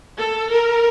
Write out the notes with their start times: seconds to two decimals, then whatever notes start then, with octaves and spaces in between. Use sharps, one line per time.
0.18 A4
0.49 A#4